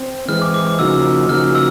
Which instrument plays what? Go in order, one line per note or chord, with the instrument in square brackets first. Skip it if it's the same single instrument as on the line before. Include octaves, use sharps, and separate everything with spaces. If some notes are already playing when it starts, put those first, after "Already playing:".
Already playing: [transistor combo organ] C4
[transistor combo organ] E3 G#3 C4 [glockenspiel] F6
[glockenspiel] D6
D6
D6
[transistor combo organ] C#3 F3 A#3 D#4 F#4 [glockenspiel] E6
[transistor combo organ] C#3 F3 A#3 D#4 F#4 [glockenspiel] F6
[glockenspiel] E6